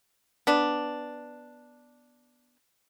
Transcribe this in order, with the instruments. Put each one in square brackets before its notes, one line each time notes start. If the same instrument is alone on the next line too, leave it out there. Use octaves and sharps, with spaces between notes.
[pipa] B3 D4